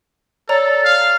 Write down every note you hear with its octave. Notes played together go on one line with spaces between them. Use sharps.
A4 C#5 D5 A#5
F5